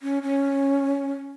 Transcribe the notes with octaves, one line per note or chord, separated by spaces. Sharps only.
C#4
C#4